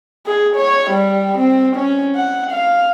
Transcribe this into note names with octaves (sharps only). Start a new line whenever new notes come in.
G#4
C#5
G3
C4
C#4
F#5
F5